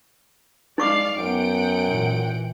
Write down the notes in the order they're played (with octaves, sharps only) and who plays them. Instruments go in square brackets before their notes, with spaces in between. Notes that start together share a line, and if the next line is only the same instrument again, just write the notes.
[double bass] G#3 [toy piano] D#4 C#6 D6 [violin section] D5 F5 C7
[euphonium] F#2 [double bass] B3 [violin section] F#5 G5 D7
[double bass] A#2 E3